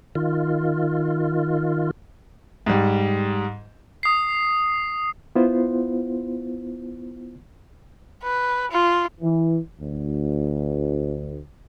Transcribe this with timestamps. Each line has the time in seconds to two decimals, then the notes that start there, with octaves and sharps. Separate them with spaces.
0.15 D#3 F4
2.66 G#2 G3
4.03 D#6 C7
5.35 B3 E4 F4 C5
8.23 B4
8.71 F4
9.21 E3
9.80 D2